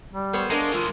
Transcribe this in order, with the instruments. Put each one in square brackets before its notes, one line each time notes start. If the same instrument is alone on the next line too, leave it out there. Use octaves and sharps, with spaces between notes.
[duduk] G3
[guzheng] B3 C5 C#5
[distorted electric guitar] G#3 [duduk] D4 [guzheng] A#4 F5 A5
[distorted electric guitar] E3 G#3 [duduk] F4